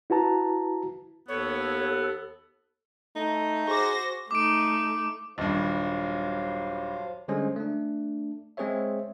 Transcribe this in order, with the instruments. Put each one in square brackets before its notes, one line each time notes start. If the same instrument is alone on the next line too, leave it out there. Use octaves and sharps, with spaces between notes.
[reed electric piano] E4 F#4 B4 A5 A#5
[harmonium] D#2 [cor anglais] B3 [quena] A4 [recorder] C#5
[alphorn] A3 [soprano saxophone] D#4
[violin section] F#4 C5 A#6 [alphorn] G#4 [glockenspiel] C#6 D6
[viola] A3 D#4 [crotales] D6 D7
[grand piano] D#1 G2 [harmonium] F#3 C5 F5
[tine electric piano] D3 G3 G#3 C#4 G#4 C5
A3 D4
G#3 C4 G#4 C5 C#5 E5